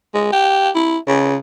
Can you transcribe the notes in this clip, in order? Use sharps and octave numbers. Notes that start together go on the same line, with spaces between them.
G#3
G4
E4
C#3